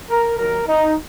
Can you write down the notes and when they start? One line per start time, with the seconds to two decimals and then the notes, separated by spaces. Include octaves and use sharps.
0.10 A#4
0.38 D#2 D#3 F#3 A#4
0.67 D#4